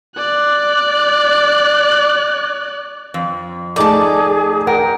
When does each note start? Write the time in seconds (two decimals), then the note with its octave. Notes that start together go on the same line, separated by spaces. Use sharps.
0.16 D5 F#6
3.14 F2
3.76 A3 D#4 G#4 A4 D5 A5
4.67 A#4 F#5 G5